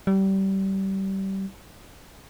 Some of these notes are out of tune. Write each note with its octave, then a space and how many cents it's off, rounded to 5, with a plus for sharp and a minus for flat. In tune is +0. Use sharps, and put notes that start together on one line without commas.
G3 -25